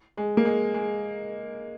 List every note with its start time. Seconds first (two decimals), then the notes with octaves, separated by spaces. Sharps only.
0.17 G#3
0.37 A#3
0.45 G#3
0.74 G#3